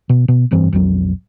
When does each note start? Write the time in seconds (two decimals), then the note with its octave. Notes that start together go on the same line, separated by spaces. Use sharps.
0.09 B2
0.28 B2
0.51 F1 G2 E3 C4
0.73 B1 F2 F#3